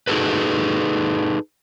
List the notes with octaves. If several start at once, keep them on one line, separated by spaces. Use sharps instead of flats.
D#4 F#4 G#4 A4 B4